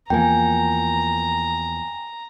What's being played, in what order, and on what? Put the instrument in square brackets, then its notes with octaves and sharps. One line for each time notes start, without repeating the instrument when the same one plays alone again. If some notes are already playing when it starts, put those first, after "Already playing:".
[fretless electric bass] E2 F3 A#3 [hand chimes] G5 G#5 [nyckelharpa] A#5